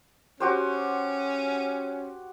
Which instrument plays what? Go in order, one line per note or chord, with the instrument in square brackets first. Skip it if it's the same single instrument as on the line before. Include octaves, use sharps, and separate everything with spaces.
[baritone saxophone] C#4 [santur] F#4 G4 C5